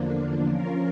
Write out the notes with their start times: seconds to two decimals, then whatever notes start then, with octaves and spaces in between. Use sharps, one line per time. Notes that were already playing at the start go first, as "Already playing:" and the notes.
Already playing: E2 D3 F3 A#3 D4
0.48 F3 C#4 F4 A#4